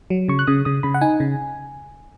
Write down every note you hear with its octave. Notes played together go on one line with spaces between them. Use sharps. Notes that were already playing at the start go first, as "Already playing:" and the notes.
F#3
C#3 C#6
F#6
C#3 D#6
C#3 D#6
C#3 B5
F#5
D#4 G#5
C#3